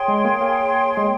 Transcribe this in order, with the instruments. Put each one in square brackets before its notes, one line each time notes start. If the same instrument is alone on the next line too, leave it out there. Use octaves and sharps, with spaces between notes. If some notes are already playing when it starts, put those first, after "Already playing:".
Already playing: [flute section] G#4 C#5 G5 C6
[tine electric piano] G#3
A#3
A#3
G#3